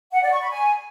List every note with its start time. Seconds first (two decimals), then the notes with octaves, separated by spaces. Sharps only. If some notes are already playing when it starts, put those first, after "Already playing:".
0.13 F#5
0.23 D5
0.32 C#6
0.42 B5
0.51 G#5